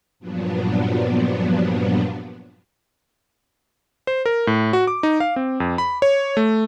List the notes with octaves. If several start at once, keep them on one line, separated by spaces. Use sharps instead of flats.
G2 A#2 F3 F#3 B3 D4
C5
A#4
A2
F#4
D6
D#4
F5
C4
F2
B5
C#5
A3